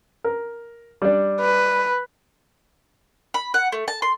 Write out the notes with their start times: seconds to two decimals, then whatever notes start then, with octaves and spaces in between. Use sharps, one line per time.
0.24 A#4
1.02 G3 D4
1.40 B4
3.34 B5
3.54 F#5
3.72 A3
3.88 A5
4.02 C6